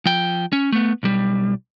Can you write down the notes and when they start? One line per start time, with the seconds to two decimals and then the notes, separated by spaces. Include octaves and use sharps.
0.06 F3 G5
0.53 C#4
0.72 A3 B3
1.03 B1 G3